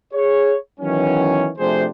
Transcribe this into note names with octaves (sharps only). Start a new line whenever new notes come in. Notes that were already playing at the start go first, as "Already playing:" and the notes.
G#4 C#5
D#3 E3 F#3 B3 C#4
C3 F3 A3 D4 G#4 C5